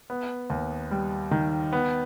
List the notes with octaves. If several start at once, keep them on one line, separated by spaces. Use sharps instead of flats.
B3
D#2
G3
D#3
B3